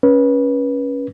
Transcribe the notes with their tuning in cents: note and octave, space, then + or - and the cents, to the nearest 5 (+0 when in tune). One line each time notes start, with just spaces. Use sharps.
C#4 +0 B4 -30